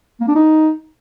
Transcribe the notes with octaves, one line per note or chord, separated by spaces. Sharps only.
A#3
D4
D#4